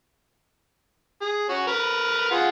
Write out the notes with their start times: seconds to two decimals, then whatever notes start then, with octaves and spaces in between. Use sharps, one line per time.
1.21 G#4
1.49 C#4 F#4
1.67 A#4 B4
2.31 F4 G#4 F#5